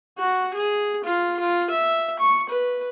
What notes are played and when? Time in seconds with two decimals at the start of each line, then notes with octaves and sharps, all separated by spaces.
0.18 F#4
0.54 G#4
1.04 F4
1.39 F4
1.70 E5
2.19 C#6
2.49 B4